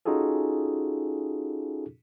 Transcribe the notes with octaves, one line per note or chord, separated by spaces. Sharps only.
C#4 D#4 F4 F#4 G#4 A4